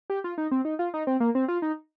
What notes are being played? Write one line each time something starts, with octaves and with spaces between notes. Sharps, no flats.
G4
F4
D#4
C4
D#4
F4
D#4
C4
A#3
C4
F4
D#4